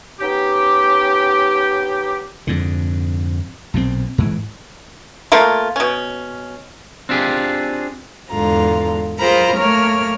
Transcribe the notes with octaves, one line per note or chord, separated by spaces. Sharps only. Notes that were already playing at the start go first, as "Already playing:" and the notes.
B3 C#4 D#4 G4
F2 G#2 D3
B1 A#2 C#3 C4
G#2 E3
A3 A#3 F4
B2 C#4
C4 D4 F4 G4 G#4
E2 G#2 D3 F4 A#5
F4 G#4 A#4 C5 A#5 B5
A3 A#3 A#4 C#5 F6